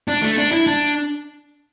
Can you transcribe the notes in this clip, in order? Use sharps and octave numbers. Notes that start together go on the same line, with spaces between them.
D4
A3
D4
E4
D4